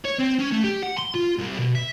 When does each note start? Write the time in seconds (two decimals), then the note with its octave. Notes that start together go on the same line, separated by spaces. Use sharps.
0.05 C#5
0.19 C4
0.39 C#4
0.52 A3
0.64 G4
0.82 F#5
0.97 C6
1.14 F4
1.38 C2
1.59 B2
1.75 E5